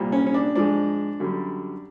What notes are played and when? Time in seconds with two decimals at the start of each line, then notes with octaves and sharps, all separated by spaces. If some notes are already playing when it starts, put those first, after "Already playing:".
Already playing: C2 A#2 G3
0.12 C#4
0.26 C#4
0.34 D4
0.55 G#2 F3 G#3 D4
1.20 F#2 D3 G3